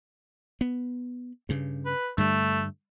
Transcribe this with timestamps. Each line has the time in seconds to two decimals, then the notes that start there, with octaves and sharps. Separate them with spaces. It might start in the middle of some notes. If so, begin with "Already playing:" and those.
0.61 B3
1.49 G2 C#3
1.86 B4
2.18 G2 D3 G3 A3